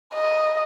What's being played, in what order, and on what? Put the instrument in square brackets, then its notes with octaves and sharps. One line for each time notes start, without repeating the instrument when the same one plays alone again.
[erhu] D#5